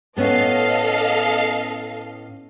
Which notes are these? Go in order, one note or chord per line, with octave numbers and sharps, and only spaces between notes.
A2 B3 C#4 A4 D#5 F5